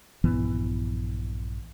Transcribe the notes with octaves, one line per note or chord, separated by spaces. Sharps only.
A#1 G2 E3 B3